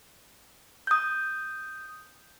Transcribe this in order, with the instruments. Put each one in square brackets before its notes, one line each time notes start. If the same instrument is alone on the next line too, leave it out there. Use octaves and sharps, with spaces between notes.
[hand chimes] D#6 G6